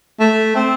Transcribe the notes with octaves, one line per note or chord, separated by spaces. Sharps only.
A3
C4